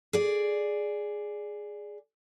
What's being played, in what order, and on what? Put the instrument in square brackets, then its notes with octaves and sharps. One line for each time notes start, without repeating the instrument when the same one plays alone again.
[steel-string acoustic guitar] G#4 D5